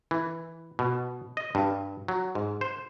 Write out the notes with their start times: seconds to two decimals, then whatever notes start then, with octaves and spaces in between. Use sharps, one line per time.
0.11 E3
0.79 B2
1.37 D#5
1.55 G2
2.08 F#3
2.35 G#2
2.61 C5